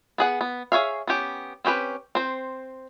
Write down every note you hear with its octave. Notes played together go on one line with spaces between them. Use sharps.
B3 G#4 F#5
B3
G#4 C#5 E5 F5
B3 C#4 G4
C4 C#4 G4 B4
C4 C5